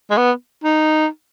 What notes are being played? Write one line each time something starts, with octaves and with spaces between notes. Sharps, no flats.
G#3
B3
D#4